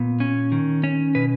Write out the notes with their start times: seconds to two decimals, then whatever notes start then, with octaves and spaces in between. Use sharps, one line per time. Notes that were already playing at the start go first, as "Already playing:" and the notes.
Already playing: A#2 B3
0.20 C#4
0.52 D#3
0.83 C#4 C#5
1.15 B2 B4